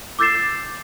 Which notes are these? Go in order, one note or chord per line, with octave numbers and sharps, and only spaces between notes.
D6 E6 G6 A6 C7 E7